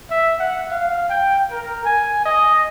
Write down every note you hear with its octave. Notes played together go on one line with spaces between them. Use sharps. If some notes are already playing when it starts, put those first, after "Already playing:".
E5
F#5
F5
G5
A#4
G#5
D#5